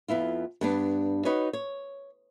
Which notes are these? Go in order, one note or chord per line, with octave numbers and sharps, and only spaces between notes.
F2 B3 E4 F4
G2 B3 D4
D#4 F#4 B4 C#5
C#5